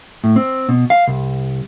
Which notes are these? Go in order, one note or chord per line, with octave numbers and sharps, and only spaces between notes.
A2
C4
B2
F5
C2